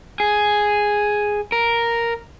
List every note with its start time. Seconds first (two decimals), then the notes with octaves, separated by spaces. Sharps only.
0.20 G#4
1.52 A#4